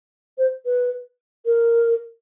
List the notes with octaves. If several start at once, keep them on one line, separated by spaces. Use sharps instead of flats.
C5
B4
A#4